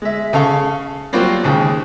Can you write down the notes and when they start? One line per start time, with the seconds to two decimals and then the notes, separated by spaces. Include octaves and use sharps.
0.02 G#3 E5
0.33 C#3 A4 F5 C#6
1.13 F#3 G3 A#3 C4 F4 F#4
1.43 D#2 G#2 C#3 G4